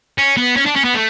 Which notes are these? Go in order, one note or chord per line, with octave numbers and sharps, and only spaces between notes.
C#4
B3
C#4
D4
C#4
B3
A3